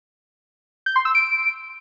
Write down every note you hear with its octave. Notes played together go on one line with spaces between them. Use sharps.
G6
C6
E6
D7